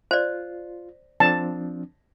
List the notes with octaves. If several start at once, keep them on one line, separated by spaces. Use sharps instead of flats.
F4 C5 D5
F3 C4 D4 A5